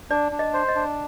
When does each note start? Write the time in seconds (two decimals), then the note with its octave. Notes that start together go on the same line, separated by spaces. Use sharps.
0.10 D4 D5
0.32 D4
0.39 D#5
0.53 C5
0.69 D#5
0.76 D4